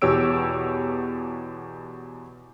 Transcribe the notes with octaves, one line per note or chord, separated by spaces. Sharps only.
E2 B2 G4 C#5 E6 D7